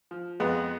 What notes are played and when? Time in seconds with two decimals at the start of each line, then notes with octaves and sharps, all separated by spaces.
0.11 F3
0.40 F2 G#3 B3